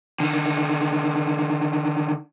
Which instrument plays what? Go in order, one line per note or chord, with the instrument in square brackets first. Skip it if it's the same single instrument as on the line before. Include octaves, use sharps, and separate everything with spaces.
[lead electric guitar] D3 D#3